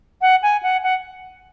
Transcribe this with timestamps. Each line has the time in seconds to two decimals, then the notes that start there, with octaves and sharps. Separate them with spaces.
0.21 F#5
0.43 G#5
0.63 F#5
0.83 F#5